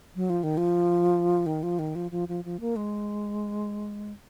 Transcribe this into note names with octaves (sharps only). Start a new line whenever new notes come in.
F#3
F3
D#3
F3
D#3
F3
D#3
F3
F3
F3
F3
A#3
G#3